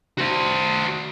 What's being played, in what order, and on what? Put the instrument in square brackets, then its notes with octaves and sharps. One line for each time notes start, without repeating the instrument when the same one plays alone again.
[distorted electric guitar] F#4 C5